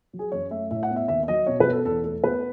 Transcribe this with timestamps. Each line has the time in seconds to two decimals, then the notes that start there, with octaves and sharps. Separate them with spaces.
0.13 F#3
0.19 G#4
0.32 F#2 C#5
0.51 A3 E5
0.71 A2 E5
0.83 F#5
0.90 B3
0.96 E5
1.08 D#2 E5
1.23 E5
1.28 F#3 D#5
1.47 B2 C#5
1.60 B4
1.66 B3
1.72 A4
1.85 E2 A4
2.04 A3 A4
2.24 B3 B4